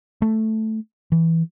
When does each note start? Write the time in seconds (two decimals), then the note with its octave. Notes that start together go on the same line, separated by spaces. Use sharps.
0.22 A3
1.12 E3